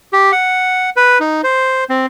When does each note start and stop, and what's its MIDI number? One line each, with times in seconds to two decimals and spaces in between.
0.13 0.32 67
0.32 0.90 78
0.96 1.18 71
1.20 1.41 63
1.44 1.84 72
1.90 2.06 60